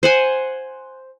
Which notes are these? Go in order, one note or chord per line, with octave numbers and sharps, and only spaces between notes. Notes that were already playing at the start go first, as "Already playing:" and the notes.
C5 F#5 G#5